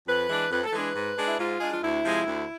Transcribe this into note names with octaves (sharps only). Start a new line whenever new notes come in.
F2 B4
E3 G#3 D4
F2 B4
A4
E3 G#3 D4 B4
G#2
G#3 D4
E4
G#2 F4
G#3 D4 G#4
F4
D2 E4
C3 F3 G#3
D2